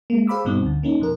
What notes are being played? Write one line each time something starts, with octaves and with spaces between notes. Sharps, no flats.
G#3 A#3
G#4 C5 F5 B5 D6 E6
G2 B2 C4 D#4
D2 D3
A#3 C#4 D#4
F2 B2 A#4